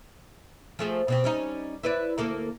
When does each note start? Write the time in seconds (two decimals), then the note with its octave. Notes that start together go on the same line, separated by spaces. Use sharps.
0.79 F3 A3 G#4
1.08 B2 C4 G4
1.24 G3 C#4 D#4
1.83 E4 B4 D5
2.18 D2 A#3 A4